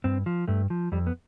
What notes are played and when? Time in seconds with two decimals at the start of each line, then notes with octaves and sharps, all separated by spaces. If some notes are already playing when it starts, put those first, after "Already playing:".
0.04 G2 C4
0.26 F3
0.48 G2 A3
0.70 F3
0.92 F2 G3
1.07 B3